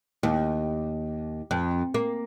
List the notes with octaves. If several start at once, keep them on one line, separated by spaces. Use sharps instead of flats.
D#2
F2
A#3